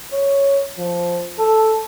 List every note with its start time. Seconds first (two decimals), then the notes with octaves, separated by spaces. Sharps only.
0.12 C#5
0.78 F3
1.38 A4